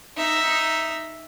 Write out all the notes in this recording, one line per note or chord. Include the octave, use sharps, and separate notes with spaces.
D#4 E5